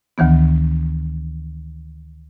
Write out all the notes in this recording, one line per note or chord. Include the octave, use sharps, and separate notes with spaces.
D2 D#3 E3 B3